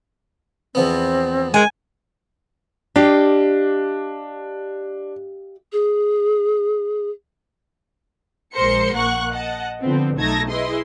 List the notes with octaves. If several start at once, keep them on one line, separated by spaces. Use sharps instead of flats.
E2 F3 B3 C4
G#3 A#4 G#5
D4 G4 D#5 F5
G#4
A#1 G#3 A#4 C5 C6 C#7
A#1 A#3 F#5 C#6 F#6
D#5 F#5 A5
D3 F3 B3 C4
B1 A3 D#4 A5 G#6 A#6
E4 G#4 B4 D#5 C6